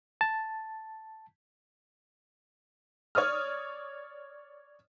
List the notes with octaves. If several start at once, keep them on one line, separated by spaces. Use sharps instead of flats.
A5
C#5 D5 D#6 F6